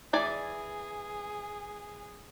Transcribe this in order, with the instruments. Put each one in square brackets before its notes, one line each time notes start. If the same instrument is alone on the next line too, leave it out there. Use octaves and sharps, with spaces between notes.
[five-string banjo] E3 D5 G#5 [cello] G#4